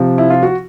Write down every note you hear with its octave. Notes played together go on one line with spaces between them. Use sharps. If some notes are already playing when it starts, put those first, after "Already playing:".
Already playing: C3 F3
E4
F4
F#4